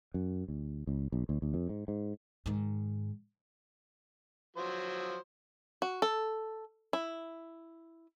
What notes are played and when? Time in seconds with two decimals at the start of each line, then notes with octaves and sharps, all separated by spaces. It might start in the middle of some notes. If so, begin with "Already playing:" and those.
0.14 F#2
0.48 D2
0.87 C#2
1.12 B1
1.29 D2
1.42 D2
1.54 F2
1.69 G#2
1.88 G#2
2.46 G#2 D#3
4.57 F3 F#3 C5
5.82 F#4
6.02 A4
6.93 E4